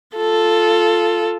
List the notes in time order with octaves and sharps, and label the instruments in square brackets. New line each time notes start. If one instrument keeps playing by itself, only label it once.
[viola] F4 A4